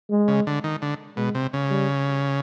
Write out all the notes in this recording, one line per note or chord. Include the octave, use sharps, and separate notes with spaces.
G#3
C#3
D3
D#3
D3
B2 G#3
C3
C#3
G3